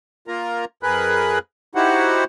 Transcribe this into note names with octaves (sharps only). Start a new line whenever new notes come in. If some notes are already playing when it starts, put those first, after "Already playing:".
A#3 F4 A#4 A#5
F2 G#4 A#4 B4 B5 F#6
D#4 E4 F#4 G4 C5 F#5